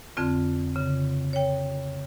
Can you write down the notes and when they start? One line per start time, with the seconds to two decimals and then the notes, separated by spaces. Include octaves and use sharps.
0.17 F2 D3 C4 F4
0.76 C#3
1.33 C#5 G5